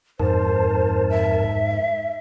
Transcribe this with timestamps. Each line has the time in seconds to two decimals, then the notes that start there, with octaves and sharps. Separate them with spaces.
0.20 F2 G#2 A#4 C5 A5
1.10 E5